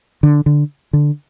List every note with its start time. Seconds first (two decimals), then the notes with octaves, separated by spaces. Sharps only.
0.23 D3
0.46 D3
0.93 D3